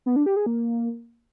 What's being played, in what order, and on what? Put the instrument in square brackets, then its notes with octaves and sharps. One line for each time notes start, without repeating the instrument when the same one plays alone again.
[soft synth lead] B3
D4
G4
G#4
A#3